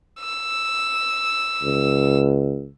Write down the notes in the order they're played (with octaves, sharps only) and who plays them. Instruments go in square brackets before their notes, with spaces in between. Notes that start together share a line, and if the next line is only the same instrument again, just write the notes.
[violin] E6
[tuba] C#2